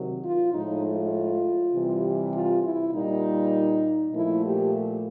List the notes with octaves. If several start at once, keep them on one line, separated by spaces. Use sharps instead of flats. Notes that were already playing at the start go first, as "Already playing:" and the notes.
Already playing: C3 D#3 F#3
F4
A2 F3 G#3 D#4
F4
C3 E3 G3
F4
E4
A#2 G3 D#4
A#2 F3 A3 E4
G4